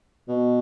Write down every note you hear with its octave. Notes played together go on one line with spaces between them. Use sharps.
B2